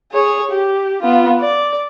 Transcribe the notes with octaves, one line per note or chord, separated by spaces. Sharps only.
G#4 C#5
G4
B3 F4
D5